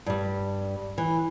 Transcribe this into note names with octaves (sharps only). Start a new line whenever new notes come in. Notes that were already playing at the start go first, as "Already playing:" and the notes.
G2 G3
E3